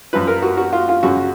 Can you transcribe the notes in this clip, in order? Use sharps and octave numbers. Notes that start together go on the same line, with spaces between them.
F#2 F3 B4
A#4
F#4
F#4
F4
F4
F#2 C#3 F#3 F#4